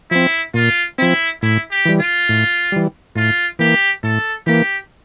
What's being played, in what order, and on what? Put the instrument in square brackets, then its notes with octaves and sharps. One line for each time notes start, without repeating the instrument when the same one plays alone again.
[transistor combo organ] F3 C4 [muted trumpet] E4
[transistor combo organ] A#2 [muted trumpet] F4
[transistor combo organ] F3 C4 [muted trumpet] E4
[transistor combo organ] A2 [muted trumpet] E4
[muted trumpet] G4
[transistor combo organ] E3 G3
[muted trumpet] F4
[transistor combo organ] A2
E3 G3
[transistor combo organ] A2 [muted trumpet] F4
[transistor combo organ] E3 A#3 [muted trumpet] G4
[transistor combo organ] A2 [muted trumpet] A4
[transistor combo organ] E3 A#3 [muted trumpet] G4